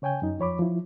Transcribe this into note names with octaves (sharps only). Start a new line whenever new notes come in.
C#3 C#5 G5 G#5 G6
F#2 D#4
F2 F3 C#5 B5 D6
F3 E4